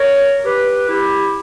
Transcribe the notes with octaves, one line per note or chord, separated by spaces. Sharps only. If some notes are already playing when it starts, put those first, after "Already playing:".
Already playing: A#4 C#5
G4 B4
E4 G4